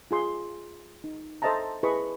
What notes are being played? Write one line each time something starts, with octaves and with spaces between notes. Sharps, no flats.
F4 G#4 C6
D#4
A4 C5 D#5 E5 A5 A#5
E4 G#4 B4 D#5 B5 C#6